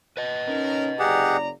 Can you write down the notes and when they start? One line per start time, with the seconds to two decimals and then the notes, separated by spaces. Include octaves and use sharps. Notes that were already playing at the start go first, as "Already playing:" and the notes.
0.17 B4 D#5
0.48 C#4 D#4 A#4
0.99 F#1 G4 G#4 D5 F#5 A#5